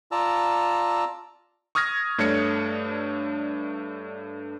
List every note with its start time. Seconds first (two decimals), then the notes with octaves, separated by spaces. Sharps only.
0.12 F4 D5 A5 A#5 E6
1.75 C#6 D#6 F6 G#6 A#6
2.18 G2 A3 D4 C#5 C#7